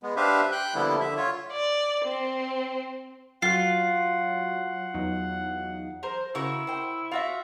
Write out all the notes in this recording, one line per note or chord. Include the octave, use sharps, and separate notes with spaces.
G#3 B3
D4 G4 B4 C5 E5 F5
G5 F#6 G6
D3 F3 G3 A#3 B3 E4
D3 E5
F4 C#5
D5
C4
F#3 F4 F#4 F#5 C7
E2 F#3 D#4
A#4 C5
C#3 E4 F#4 A#4 C#6
C5 G5
F4 F#4 E5 F5